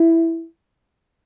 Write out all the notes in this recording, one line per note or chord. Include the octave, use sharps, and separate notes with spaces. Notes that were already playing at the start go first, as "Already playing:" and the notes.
Already playing: E4